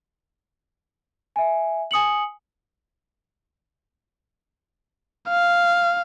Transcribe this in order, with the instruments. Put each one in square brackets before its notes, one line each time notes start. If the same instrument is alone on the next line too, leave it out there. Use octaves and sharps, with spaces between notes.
[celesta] E5 G#5
G#5 D#6 C#7 F#7
[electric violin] F5